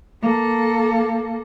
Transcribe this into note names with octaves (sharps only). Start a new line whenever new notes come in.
A#3 A4